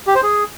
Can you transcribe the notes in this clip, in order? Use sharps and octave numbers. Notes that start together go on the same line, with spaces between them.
G4
C5
G#4